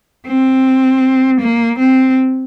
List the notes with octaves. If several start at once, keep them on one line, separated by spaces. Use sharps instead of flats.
C4
A#3
C4